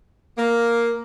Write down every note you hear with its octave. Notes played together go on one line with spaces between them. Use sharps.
A#3